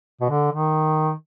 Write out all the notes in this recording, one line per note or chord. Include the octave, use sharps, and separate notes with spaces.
B2
D3
D#3